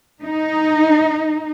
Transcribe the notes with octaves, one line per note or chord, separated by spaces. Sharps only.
D#4